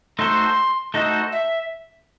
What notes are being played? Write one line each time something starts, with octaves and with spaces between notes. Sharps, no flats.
A3 D#4 F#4 A4 C5 C6
A3 D#4 F#4 A4 C5 D#5
E5